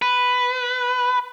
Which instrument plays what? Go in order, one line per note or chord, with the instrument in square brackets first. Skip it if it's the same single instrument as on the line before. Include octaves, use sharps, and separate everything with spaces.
[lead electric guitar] B4